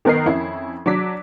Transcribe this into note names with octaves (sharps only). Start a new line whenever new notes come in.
D#3 B3 A#4 D#5 C7
F2 C#4 E4
F#3 D4 D6 B6